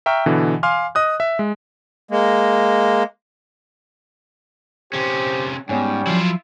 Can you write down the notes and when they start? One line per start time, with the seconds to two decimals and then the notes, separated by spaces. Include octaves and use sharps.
0.06 E5 G5 A#5 C#6 F6
0.26 B2 D3 E3
0.63 F5 G#5 C6 D6 F6
0.95 D#5 D#6 F#6
1.20 E5
1.39 G#3
2.11 G#3 A#3
4.93 C3 C#4 G4 C5
5.69 G#2 G3 B3 C#4 C#5 G5 G#5
6.07 F3 F#3 E4 F4